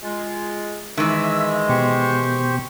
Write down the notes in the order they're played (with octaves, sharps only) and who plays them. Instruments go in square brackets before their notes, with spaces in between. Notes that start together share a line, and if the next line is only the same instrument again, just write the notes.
[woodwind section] G#3 F4
[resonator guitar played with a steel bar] D#3 E3 [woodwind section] G#3 [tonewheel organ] E5 [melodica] E6
[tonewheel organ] B2 [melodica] G4 C5 C#6